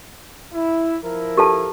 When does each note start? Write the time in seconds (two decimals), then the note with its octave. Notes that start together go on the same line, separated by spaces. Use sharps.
0.53 E4
1.04 F3 E4 A#4
1.37 G4 A4 A5